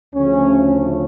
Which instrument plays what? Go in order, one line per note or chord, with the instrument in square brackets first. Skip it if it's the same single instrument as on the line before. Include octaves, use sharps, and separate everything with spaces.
[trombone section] D2 C#3 F3 A3 C#4